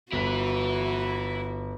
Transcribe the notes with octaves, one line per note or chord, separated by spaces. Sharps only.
G1 E4 F#4 B4 B6